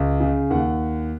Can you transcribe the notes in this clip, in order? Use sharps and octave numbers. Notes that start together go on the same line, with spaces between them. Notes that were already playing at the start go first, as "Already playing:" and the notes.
Already playing: C#2
C#3
D#2 F#5